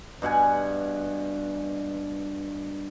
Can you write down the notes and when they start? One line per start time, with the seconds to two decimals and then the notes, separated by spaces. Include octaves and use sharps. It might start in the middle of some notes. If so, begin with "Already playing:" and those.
0.22 G2 B2 F#5 G#5